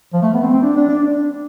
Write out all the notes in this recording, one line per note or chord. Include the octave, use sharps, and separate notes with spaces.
F3
A3
B3
C4
C4
D4
D4
D4